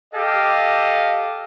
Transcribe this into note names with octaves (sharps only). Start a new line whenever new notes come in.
G4 A4 D#5 F5